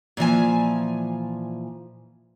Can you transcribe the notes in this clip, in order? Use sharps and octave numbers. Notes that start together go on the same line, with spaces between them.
A#2 E3 F3 G#5